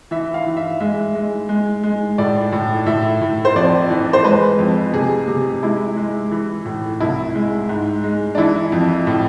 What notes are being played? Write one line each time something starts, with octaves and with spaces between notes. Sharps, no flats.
E3 E5
F5
E3
E5
G#3 E5
G#3
G#3
G#3
A2 D5
A2
A2 E5
A2
C5
F2 D5
E3
C5
G#3 B4
F2
C3 G#4
C3
G#3 E4
G#3
E3
A2
C2 E4
G#3
G#2
G#3
D4
E3 E4
F2
A2